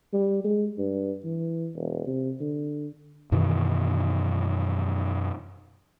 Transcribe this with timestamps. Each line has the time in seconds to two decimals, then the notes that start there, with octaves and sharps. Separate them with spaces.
0.13 G3
0.45 G#3
0.78 G2
1.24 E3
1.75 E1
2.06 C3
2.40 D3
3.32 F#2 B2 D#3 E3